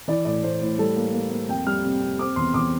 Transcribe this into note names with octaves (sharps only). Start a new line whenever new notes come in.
E3 D5
A2 D5
A2 C5
A2
G3 A4
A#3
A#3
A#3
F2 G5
G3 F6
C3
C3
C4 D6
E2 C6
E2 D6